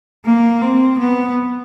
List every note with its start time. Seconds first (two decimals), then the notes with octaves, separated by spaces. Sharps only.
0.25 A#3
0.62 C4
0.99 B3